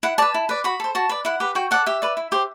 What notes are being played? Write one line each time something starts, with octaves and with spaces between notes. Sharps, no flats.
E4 F#5
B4 D5 A5
E4
B4 D5
F#4 B5
A4 C5
F#4 A5
B4 D5
E4 F#5
G4 B4
F#4 G5
A4 D5 F#5
G4 E5
B4 D5
E4
G4 C5